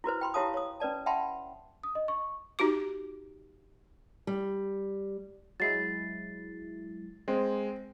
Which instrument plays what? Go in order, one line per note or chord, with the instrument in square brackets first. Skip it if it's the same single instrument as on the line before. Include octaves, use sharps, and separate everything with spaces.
[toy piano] E4 F#4 B4 C5
G5 B5 C6
E4 G4 C#5 F5 A5 D#6
C#5 D#6
C#4 B4 D5 A5
E5 F#5 G5 A5 B5 C6
[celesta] D#6
D#5
C#6
[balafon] D#4 F#4 G4 D6
[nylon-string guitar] G3
[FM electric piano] F#3 G#3 E4 [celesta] A6 C7
[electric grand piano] G#3 [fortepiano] C4